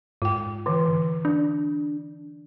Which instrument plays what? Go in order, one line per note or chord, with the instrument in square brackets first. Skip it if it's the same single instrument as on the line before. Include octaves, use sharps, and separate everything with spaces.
[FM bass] G#2 [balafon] F4 G5
[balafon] D3 E3
[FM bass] D4